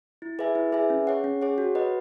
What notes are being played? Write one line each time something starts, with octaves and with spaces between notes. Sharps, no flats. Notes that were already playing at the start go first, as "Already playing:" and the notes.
E4
G#4 B4 E5 G#5
E4
G#4 B4 E5 G#5
C#4
G#4 C#5 F#5
C#4
G#4 C#5 F#5
F#4
B4 D#5 F#5